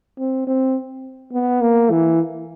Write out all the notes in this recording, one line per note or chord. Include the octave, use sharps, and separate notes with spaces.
C4
C4
B3
A#3
E3